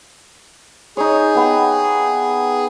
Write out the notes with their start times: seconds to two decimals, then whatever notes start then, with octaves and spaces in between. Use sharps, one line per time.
0.97 D#4 G#4 C#5
1.35 B3 G4